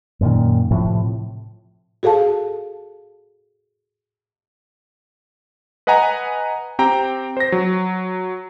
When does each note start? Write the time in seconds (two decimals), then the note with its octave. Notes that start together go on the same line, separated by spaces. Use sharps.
0.21 F#2 A#2 D#3
0.71 A2 C3 F3
2.03 F#4 G#4 A4 F5 A5
5.87 B4 D#5 F#5 G#5 A#5
6.79 C4 G4 G5 A#5
7.37 C5 A#6
7.52 F#3